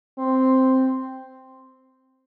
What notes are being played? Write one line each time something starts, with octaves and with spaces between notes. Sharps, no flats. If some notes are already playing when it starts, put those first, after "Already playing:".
C4